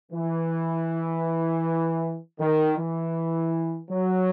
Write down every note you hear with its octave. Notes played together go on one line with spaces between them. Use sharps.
E3
D#3
E3
F#3